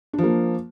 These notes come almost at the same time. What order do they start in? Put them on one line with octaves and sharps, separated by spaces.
D4 F3 A#3